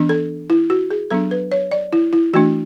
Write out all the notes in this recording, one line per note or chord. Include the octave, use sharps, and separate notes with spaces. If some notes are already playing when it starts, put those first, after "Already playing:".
Already playing: E3 B3 D4
A4
E4
F#4
G#4
F#3 B3 D4 A4
B4
C#5
D5
E4
E4
E3 A3 D4 F#4